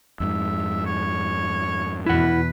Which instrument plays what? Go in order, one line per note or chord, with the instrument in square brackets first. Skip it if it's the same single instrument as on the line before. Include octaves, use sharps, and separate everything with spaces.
[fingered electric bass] F2 G#2 [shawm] E5
[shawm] C#5
[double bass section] E2 B2 [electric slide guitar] E4 F#5 [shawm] B4